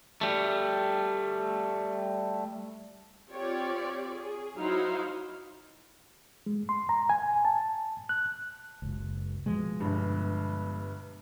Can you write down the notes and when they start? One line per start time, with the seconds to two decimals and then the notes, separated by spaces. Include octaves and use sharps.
0.21 G3 A3
3.29 C4 F4 G4 C#5 D5
4.10 G#4
4.59 F#3 D#4 E4 C5 F5
6.46 G#3
6.69 C6
6.89 A#5
7.09 G#5
7.45 A5
8.09 F#6
8.82 F#1 C#2
9.46 B2 F3 G#3
9.80 G1 G2